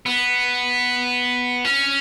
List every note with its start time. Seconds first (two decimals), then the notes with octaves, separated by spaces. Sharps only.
0.06 B3
1.65 C#4